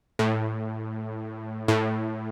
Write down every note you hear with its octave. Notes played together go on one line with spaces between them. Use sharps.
A2
A2